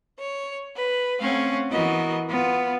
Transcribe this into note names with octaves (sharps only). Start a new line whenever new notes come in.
C#5
B4
A3 C4 C#4 F5 F#5
E3 B3 F#4 A#4 D#5
B3 F4